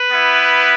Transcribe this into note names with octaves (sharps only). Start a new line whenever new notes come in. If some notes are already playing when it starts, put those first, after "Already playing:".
Already playing: B4
B3 E4